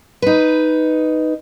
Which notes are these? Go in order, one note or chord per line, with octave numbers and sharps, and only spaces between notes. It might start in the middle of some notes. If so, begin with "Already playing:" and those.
D#4 B4